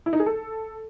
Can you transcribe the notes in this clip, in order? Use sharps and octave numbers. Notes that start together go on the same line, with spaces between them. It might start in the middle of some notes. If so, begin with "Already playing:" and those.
E4
D#4
G#4
A4